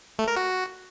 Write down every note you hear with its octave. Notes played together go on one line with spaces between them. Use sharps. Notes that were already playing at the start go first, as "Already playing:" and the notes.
A3
A#4
F#4